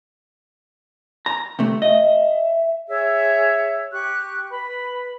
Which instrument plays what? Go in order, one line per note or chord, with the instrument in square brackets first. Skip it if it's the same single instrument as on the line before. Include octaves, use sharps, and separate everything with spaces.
[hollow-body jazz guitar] A#5
C3 A3
[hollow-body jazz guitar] D#5 [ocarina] E5
[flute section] G#4 C#5 E5
G4 C#6 F#6
B4 B5